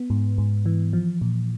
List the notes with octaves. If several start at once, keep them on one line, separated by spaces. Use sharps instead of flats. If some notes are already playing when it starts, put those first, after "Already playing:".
Already playing: B3
G#2
G#2
E3
F3
A#2